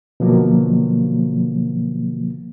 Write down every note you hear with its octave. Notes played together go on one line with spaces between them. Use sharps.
B2 D3 F3 F#3 A#3